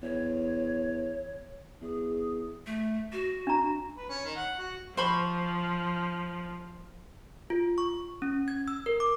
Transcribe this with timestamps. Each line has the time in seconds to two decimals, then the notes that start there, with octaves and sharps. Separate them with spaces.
0.02 E2 C#5
1.82 E2 G#4
2.66 A3
3.12 F#4
3.47 D4 A#5
3.97 B4
4.09 C#4
4.24 D#3
4.36 F#5
4.58 F#4
4.97 F3 C5 B5 C#6
7.50 F4
7.78 C#6
8.22 C#4
8.48 G#6
8.68 E6
8.86 A#4
9.00 D6